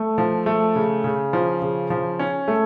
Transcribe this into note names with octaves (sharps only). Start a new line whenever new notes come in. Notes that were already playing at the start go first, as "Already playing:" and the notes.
Already playing: A3
F3
A3
C#3
C#3
F3
C#3
F3
C#4
A3